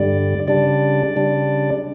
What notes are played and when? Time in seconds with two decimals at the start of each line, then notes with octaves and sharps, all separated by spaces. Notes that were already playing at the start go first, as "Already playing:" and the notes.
Already playing: G2 D3 G3 D5
0.48 C#3 G3 D4 D5
1.16 C#3 G3 D4